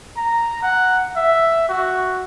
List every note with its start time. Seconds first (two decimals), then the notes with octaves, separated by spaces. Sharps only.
0.17 A#5
0.63 F#5
1.16 E5
1.69 F#4